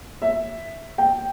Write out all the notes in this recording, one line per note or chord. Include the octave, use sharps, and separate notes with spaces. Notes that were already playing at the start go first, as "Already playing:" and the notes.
E5
G5